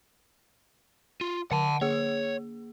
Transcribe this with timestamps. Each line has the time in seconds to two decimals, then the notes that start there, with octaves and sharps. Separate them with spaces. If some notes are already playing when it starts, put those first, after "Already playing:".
1.21 F4
1.52 D3 F#5 A5
1.81 A#3 G#4 C#5